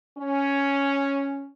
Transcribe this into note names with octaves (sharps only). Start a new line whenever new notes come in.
C#4